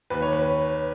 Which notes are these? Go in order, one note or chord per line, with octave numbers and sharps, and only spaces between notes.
D#2 B4
C#5
B4